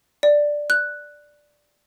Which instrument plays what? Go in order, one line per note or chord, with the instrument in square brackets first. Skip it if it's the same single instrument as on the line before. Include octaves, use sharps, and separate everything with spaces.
[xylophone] D5
F#6